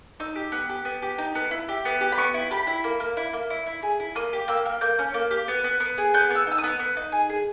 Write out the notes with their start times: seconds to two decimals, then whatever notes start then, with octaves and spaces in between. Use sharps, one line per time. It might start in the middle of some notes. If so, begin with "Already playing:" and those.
0.20 D#4 E6
0.35 G4
0.52 B3
0.69 G4
0.85 B3
1.02 G4
1.18 D#4
1.35 B3
1.51 E4
1.69 G4
1.85 B3
2.01 G4
2.12 B5
2.18 B3 C#6
2.34 E4
2.51 G4 B5
2.67 E4
2.84 A#3
3.00 A#3
3.17 E4
3.33 A#3
3.50 E4
3.66 E4
3.83 G#4
4.00 E4
4.15 A#3 D#6
4.33 G4
4.48 A#3 E6
4.66 A#3
4.81 A#3 G6
4.99 C#4
5.14 A#3
5.31 G4
5.48 B3
5.64 B3
5.80 B3
5.98 G#4
6.14 B3 G6
6.30 B3 E6
6.47 D#4 E6
6.58 D#6
6.63 B3
6.79 B3
6.97 D#4
7.12 G#4
7.29 G#4